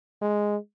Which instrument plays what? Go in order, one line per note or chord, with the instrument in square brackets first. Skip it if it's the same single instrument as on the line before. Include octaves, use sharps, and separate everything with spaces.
[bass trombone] G#3